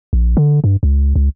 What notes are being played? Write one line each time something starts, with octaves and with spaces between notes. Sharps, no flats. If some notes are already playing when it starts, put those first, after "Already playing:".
A#1
D3
G2
C#2
C#2